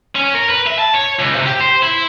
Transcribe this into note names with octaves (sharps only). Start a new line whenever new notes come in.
C#4
A#4
B4
E5
A5
C#5
C#2
C3
G4
C5
E4